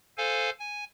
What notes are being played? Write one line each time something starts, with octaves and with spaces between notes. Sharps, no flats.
A4 C5 F5 G#5
G#5